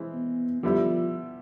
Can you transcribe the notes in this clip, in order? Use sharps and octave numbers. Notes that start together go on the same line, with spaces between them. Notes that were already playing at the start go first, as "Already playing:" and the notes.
Already playing: E3 G#3 C4
B3
D3 F3 G3 B3 E4 G4